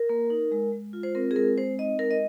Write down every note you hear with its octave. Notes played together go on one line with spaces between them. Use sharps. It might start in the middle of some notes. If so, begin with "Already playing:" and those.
Already playing: A#4
A#3
D#4
G#3
G#3
F4
C5
C4 A#4
G#4
G#3 A#4
C4 C5
D#4 D#5
G#3 A#4
D#5